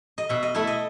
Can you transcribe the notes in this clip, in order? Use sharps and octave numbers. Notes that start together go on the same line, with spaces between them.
D#5
B2 E5
D#5
A3 E4 E5
D#5